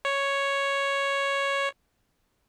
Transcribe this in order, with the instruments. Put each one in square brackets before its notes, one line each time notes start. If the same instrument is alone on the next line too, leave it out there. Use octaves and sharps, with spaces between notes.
[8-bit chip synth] C#5